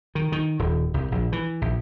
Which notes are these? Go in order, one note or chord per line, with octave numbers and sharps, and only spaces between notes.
D#3
D#3
D#1
C2
A#1
E3
A#1